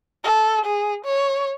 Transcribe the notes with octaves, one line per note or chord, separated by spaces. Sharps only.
A4
G#4
C#5